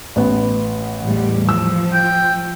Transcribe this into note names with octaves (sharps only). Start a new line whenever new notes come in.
A1 B3
E2 A2 G3
F3 E6
G5